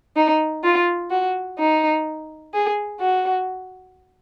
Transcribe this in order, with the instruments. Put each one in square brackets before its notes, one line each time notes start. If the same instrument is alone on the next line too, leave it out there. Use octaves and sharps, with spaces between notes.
[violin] D#4
F4
F#4
D#4
G#4
F#4